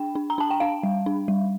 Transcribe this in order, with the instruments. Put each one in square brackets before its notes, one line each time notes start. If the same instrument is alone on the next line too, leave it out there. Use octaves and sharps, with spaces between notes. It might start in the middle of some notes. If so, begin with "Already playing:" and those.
Already playing: [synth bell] D4 G5
D4
A#5
D4 A5
G5
D4 F5
G3
D4
G3